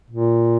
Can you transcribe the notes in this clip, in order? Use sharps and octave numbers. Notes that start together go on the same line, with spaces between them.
A#2